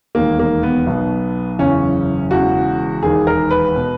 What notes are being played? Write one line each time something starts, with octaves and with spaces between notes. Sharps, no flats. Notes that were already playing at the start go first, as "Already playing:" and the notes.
E1 D#2 D#3 A#3
A#3
B3
B1 B2
F#1 E2 C#3 C#4
E1 E2 C#3 F#4
E1 D#2 D#3 G#4
A#4
B4
B2